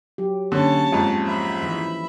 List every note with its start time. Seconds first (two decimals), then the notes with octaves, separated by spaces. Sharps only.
0.18 F#3 G4
0.52 D3 A#3 C#4 C#5 A5
0.92 F2 G#2 F3
1.26 E5 B5
1.62 D#3 E3